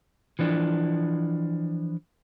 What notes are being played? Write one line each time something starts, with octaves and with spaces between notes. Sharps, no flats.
E3 F3 D4